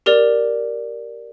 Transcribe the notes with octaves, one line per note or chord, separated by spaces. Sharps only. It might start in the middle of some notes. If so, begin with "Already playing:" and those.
G4 A#4 D5 F7